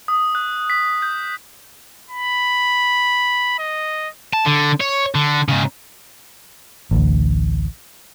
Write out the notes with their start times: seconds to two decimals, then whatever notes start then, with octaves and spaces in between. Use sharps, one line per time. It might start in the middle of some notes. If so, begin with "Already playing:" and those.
0.08 D#6
0.35 F#6
0.70 B6
1.02 G6
2.10 B5
3.59 D#5
4.33 A5
4.46 D3
4.80 C#5
5.15 D3
5.48 G#2 C#3
6.91 A1 D2